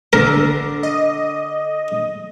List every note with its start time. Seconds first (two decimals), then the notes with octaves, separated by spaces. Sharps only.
0.13 D3 A#4
0.83 D#5